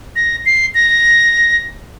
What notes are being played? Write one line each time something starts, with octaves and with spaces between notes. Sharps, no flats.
A#6
C7
A#6